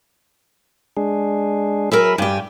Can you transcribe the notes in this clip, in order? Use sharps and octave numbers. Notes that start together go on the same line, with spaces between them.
G#3 D4 G#4
F#3 G#4 A#4 B4 E5 B5
G2 G4 G5 G#5